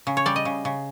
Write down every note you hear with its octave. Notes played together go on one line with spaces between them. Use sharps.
C#3
C#5
G3 D5
D#5
C#3
C#3